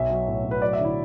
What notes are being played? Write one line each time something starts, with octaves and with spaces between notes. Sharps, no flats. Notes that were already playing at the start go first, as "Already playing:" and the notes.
Already playing: B1 E5
F#3
A2
B1
B4
F#3 D5
E5
D3
E4